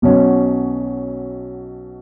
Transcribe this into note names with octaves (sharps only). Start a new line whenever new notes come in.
B1 B2 F#3 C#4